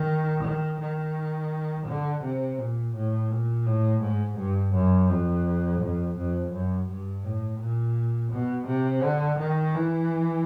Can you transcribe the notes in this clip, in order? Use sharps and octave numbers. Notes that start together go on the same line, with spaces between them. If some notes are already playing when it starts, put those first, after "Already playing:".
Already playing: D#3
D#3
D#3
D3
C3
A#2
A2
A#2
A2
G#2
G2
F#2
F2
F2
F2
F#2
G2
A2
A#2
B2
C3
D3
D#3
E3